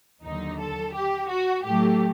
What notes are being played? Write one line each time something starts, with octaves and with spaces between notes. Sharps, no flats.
D#2 D3 F#3 D#4
A4
G4
F#4
A2 F#3 A3 G4